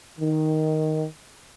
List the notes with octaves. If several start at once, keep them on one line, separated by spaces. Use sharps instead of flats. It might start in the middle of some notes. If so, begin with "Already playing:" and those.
D#3